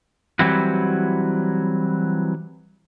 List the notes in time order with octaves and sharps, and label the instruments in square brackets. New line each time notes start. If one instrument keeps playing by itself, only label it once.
[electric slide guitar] E3 F#3 G3 C4 E4 F#4